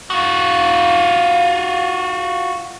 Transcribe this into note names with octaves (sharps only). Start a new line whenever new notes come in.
F4 F#4